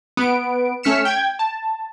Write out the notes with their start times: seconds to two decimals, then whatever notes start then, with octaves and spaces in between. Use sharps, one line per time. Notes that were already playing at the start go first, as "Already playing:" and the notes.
0.17 B3 D7
0.83 A3 C#4 F6 B6 C#7 E7
1.05 G5 G#6
1.39 A5